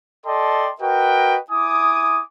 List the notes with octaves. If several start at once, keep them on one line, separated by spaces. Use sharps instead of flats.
A4 D5 D#5 G5 A5 C6
F#4 A#4 B4 D#5 G5
E4 G#5 D6 D#6